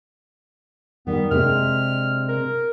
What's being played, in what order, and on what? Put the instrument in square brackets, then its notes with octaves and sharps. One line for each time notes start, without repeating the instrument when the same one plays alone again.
[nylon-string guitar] D#3 G3 [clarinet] B3
[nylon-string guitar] C3 G#3 D4 [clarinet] F6
[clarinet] A#4